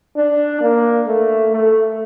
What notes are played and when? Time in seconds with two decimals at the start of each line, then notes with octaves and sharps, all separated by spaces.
0.16 D4
0.61 A#3
1.07 A3
1.52 A3